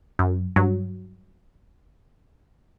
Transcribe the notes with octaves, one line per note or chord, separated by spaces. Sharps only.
F#2
G2 F#3